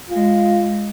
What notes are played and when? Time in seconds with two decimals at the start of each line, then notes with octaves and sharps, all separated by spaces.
0.10 G#3 F4